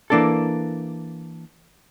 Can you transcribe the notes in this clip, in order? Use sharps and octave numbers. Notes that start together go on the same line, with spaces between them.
E3 A#3 D4 A4